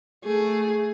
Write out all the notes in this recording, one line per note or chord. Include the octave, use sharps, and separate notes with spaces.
A3 G#4